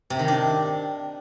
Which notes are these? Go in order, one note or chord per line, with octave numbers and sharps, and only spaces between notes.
C3
D#3
D4